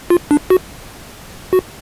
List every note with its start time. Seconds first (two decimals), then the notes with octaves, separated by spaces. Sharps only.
0.10 F4
0.31 D4
0.50 F#4
1.53 F#4